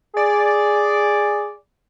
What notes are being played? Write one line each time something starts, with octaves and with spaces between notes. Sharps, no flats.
G#4 D5